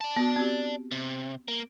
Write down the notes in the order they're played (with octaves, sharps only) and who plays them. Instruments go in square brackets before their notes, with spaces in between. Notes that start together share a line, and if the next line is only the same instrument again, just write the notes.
[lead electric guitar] D5 A5
[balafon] B3 F#4
C4 F#4 G4
[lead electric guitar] C3
A#3